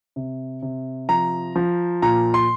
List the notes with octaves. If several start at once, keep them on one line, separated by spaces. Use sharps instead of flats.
C3
C3
F3 A#5
F3
A#2 A#5
C6